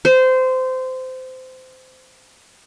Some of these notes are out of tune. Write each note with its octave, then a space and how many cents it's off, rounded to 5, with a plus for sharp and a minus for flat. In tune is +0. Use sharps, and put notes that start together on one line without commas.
C5 -20